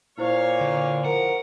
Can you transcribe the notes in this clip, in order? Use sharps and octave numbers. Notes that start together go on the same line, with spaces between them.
A#2 E4 C5 C#5 F5 C#6
D3
F3 A#4 F#5